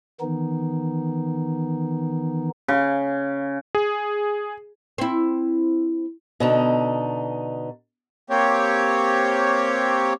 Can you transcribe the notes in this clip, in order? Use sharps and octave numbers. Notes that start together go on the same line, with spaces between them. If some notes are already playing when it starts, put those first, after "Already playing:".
D#3 E3 B3 D#4
C#3
G#4
C4 E4
B2 D3 D#4
A#3 C4 G4 C#5